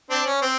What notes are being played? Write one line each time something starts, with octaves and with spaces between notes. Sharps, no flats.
C4 D4
C#4
C4